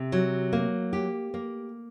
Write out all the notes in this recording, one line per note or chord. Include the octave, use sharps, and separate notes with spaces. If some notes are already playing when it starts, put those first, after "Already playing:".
Already playing: C3
F#3
A#3
G4
A#3